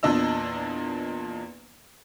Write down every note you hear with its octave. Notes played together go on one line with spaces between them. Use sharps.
E2 A#2 D4 D#5 E6